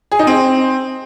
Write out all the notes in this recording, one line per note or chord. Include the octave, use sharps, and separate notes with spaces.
G#4
D#4
C4